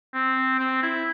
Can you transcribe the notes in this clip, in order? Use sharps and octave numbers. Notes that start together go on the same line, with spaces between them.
C4
C4
E4